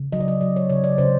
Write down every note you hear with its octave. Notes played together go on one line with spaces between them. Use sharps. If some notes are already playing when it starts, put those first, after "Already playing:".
Already playing: C#3
F#3 D#5
D5
D#5
F#3 D5
C#5
C#3 C#5
D5
C#3 C5